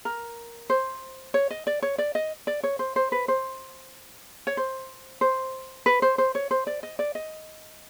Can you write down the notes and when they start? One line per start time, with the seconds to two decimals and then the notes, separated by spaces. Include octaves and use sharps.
0.05 A#4
0.70 C5
1.34 C#5
1.51 D#5
1.67 D5
1.83 C#5
1.98 D5
2.15 D#5
2.47 D5
2.64 C#5
2.79 C5
2.96 C5
3.12 B4
3.28 C5
4.47 C#5
4.57 C5
5.21 C5
5.86 B4
6.02 C5
6.18 C5
6.35 C#5
6.51 C5
6.67 D5
6.83 D#5
6.99 D5
7.15 D#5